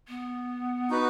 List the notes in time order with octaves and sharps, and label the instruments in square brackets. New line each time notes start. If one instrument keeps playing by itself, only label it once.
[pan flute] B3
[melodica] D#4 F#4 B4